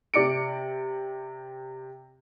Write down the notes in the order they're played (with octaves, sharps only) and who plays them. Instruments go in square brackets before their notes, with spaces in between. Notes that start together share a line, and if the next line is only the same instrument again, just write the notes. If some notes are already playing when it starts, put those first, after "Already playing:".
[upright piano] C3 D5 C#7 D7